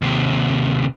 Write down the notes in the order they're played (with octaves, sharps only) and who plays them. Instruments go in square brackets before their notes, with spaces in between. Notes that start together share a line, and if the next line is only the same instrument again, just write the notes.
[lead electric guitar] D#2 C3